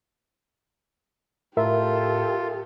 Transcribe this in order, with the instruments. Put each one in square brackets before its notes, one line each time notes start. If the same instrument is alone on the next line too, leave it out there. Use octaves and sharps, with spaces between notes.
[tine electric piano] A2 [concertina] F4 [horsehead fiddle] G4 A4 [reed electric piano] A#4 E5